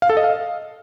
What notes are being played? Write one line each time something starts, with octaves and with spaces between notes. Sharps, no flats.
F5
A4
D#5
F5